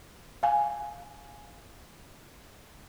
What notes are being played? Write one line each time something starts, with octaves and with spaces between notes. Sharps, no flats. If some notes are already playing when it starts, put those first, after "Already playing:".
F5 G#5